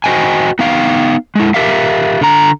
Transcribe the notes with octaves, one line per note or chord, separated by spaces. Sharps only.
F#4 C5 D#5 G5 G#5
B3 D#4 F5 G5
G#3 E4
G4 A#4 E5 F5
D3 A#5